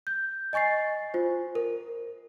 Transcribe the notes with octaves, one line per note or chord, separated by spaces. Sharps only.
G6
D#5 G#5 C#6 A6 C7
F4 C5
A#4